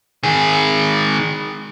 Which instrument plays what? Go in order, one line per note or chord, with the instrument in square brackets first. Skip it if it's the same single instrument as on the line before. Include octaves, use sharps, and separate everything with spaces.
[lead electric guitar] D#3 G#4